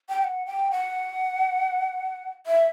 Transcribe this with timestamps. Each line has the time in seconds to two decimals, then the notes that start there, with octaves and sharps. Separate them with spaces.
0.09 G5
0.21 G5
0.24 F#5
0.46 G5
0.71 F#5
2.47 E5